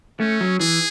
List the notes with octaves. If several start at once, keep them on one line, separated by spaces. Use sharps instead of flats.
A3 C#4
F#3
E3 G#4